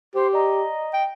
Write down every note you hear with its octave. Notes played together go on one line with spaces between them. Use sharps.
G4 C5
D5 D#5 A#5
G5